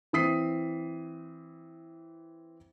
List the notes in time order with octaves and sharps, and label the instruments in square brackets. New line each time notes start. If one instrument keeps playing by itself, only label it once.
[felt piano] E3 C4 D#6 B6 C7